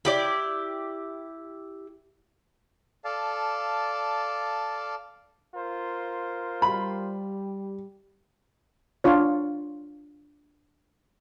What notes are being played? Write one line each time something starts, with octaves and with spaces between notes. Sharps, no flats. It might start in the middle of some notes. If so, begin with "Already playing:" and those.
E4 G4 D5
A4 D5 F5 A5
F4 A#4 C5
G3 B5
D4 F4 C#5